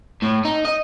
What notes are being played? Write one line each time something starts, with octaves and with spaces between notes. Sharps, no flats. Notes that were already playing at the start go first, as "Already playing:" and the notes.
A2
D#4
D#5